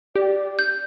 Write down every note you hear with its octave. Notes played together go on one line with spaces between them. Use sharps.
G4 D5
G6